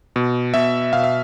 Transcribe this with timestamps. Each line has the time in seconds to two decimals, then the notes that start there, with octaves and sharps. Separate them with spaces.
0.16 B2
0.54 B2 E5
0.93 B2 F5
1.04 E5